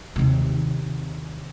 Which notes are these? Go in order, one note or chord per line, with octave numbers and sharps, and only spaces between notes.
D#2 C3